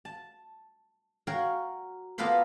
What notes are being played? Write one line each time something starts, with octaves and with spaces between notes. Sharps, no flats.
A5
F#4 A#4 C#5 F5 G5
A#3 B3 F4 A4 B4 C5